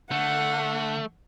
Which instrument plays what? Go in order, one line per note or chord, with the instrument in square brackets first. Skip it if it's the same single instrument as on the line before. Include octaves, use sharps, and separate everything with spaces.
[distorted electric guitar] D3 [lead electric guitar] A3 [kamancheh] F#5